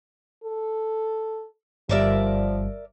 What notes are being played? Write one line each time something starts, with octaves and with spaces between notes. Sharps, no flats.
A4
G1 F3 G3 A#4 D5 E5